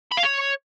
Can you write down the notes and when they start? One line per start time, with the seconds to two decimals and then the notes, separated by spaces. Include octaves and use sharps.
0.12 B5
0.17 F5
0.23 C#5